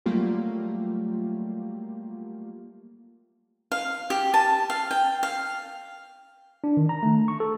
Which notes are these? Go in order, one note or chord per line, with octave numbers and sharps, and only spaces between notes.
F#3 G3 A3 A#3 F4 G4
F5
G4
A5
F5
G5
F5
D4
D#3
A#5
A3
C#6
A4